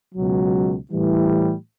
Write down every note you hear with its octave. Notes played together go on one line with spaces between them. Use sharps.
C#2 B2 F#3
A2 E3 G3